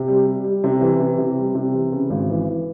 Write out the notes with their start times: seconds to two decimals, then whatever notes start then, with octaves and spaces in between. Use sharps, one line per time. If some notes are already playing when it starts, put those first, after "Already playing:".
Already playing: C3
0.08 G3
0.27 G3
0.44 G3
0.64 C3
0.81 E3
1.00 C3
1.18 C3
1.37 G3
1.55 C3
1.73 E3
1.92 C#3
2.10 G#1
2.29 E3
2.48 E3